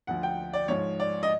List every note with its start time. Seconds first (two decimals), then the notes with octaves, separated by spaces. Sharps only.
0.07 D2 D3 F3 F#5
0.23 G5
0.54 D5
0.68 G#2 F3 C#5
1.00 D5
1.23 D#5